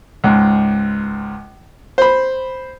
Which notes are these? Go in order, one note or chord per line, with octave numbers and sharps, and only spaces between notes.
C#2 G#2
C5 B5